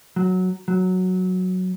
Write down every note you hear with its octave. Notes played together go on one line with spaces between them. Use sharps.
F#3
F#3